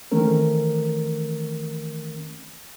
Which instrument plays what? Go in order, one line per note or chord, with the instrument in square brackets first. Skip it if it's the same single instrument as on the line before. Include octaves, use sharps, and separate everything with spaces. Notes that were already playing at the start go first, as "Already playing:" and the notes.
[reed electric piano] D#3 E3 A3 C4 C#4 A#4